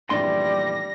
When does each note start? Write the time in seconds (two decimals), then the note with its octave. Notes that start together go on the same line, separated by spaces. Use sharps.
0.10 F1 A#1 E3 G3 D5 C6 A#6